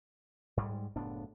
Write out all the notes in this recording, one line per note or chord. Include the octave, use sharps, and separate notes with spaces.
G#2 G3 G#3
F#1 A2 B3 D4